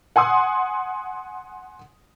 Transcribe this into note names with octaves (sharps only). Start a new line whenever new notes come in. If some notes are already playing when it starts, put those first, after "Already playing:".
F#5 G#5 C6 D#6